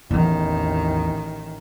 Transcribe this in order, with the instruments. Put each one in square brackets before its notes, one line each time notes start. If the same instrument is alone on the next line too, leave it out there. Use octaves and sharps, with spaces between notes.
[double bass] A1 D#3 [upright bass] E2 C4